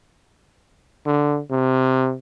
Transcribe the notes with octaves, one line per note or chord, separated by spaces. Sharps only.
D3
C3